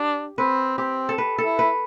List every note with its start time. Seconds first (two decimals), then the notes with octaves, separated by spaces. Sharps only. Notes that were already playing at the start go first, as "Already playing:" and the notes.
Already playing: D4 G4
0.38 C4 B4
0.78 C4 G4
1.09 A4
1.18 B4
1.38 A4
1.45 E4
1.59 B4